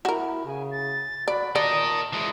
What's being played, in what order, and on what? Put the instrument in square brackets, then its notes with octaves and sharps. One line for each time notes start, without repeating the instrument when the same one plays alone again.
[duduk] E4 [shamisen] F#4 A#4
[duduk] C#3 [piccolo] G#5
[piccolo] A6
[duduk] F#4 [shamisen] D5 [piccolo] B5
[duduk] A#2 [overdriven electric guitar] A#4 D#5 [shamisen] D5 [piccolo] A5
[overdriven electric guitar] E3 G#3